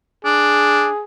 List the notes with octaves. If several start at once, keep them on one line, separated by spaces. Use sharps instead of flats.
D4 G#4